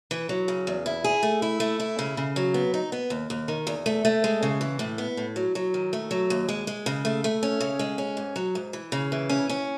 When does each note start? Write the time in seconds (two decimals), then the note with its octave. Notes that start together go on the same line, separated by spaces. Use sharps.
0.11 E3
0.29 F#3
0.48 C#3
0.67 E2
0.86 E4
1.04 G#4
1.23 A3
1.42 E4
1.60 A3
1.80 E4
1.99 C#3
2.17 C#3
2.36 F#3
2.54 B3
2.74 D#4
2.92 B3
3.10 D#2
3.30 D#2
3.48 D#3
3.67 E2
3.86 A3
4.05 A3
4.24 G#3
4.43 C#3
4.61 E3
4.79 A2
4.98 B3
5.17 A2
5.36 F#3
5.55 F#3
5.74 D#3
5.93 A3
6.11 F#3
6.30 D#2
6.49 G#3
6.67 G#3
6.86 C#3
7.05 A3
7.24 A3
7.43 C#4
7.61 C#3
7.79 G#3
7.98 C#4
8.17 G#2
8.36 F#3
8.55 G#2
8.73 E3
8.92 C#3
9.12 E3
9.29 C#4
9.49 C#4